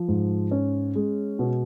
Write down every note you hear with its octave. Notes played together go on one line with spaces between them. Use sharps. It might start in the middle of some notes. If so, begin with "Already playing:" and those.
Already playing: F3
G#2
C#4
G#3
B2